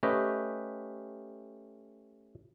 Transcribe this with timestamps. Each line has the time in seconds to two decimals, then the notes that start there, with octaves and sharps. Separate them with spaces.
0.03 A3 C#4 G4 B4 D#5 G5